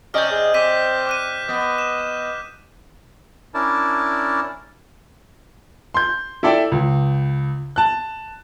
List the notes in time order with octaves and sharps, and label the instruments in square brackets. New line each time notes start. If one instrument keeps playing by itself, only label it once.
[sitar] C3 D5 D#5 [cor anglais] C#4 [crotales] F6 G6
[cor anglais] G#4
[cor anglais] C4 [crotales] D6 B6 D#7
[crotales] D6 F#6 D#7
[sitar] B3 [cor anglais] D#5
[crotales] E7
[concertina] C#4 D4 E4 A#4 D5 A5
[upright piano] C6 G6
E4 A4 D5 E5 G5
C#2
A5 F#6